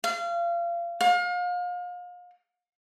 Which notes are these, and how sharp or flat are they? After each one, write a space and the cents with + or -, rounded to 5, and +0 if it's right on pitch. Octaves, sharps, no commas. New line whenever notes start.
F5 -30
F5 +35